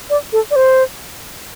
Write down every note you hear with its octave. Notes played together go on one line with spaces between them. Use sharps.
D5
A4
D5
C5